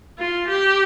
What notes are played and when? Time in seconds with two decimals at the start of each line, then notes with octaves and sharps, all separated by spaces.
0.19 F4
0.48 G4